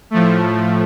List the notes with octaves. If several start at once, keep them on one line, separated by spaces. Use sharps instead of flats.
A2 F3 A3